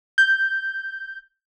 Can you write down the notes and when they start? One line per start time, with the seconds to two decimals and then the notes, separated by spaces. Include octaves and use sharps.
0.18 G6